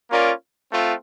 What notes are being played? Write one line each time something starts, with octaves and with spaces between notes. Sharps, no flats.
A#3 C#4 F4 A#4 D5
A3 C4 F4